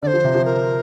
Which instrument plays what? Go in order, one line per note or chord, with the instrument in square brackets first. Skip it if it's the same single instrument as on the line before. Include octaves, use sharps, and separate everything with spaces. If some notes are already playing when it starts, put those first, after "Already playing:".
[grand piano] D3 [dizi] D5
[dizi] C5
[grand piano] F3
C3
F3
[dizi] A#4